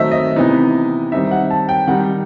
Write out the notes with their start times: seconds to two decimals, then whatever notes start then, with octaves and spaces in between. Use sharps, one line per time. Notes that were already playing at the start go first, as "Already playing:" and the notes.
Already playing: D#3 F#3 A3 C4 D#4 D#5 E5
0.11 D#5
0.36 C3 E3 B3 D#4
1.12 D#3 G3 C4 D#4 E5
1.31 F#5
1.50 A5
1.69 G5
1.87 D#3 G3 D#4 F#5